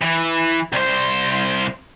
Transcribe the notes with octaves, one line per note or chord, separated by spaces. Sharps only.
E3
C2 C5